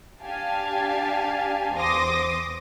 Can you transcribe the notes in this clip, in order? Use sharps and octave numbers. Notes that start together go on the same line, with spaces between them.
D4 G4 F5 G#5 A5
E2 C5 C6 D6 D#6 A#6